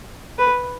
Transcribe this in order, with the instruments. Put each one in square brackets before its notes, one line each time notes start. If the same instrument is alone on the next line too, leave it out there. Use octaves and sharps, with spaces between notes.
[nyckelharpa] B4